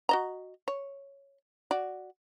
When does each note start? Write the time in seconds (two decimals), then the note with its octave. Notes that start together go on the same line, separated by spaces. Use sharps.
0.09 F#4 D#5 A#5
0.68 C#5
1.71 F#4 D5